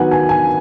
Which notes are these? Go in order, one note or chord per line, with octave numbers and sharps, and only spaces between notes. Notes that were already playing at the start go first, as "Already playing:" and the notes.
Already playing: D#3 F#3 B3 F#5 G#5
G#5
G#5